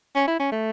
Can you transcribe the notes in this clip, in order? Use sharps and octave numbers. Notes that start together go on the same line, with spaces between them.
C#4
E4
C#4
A3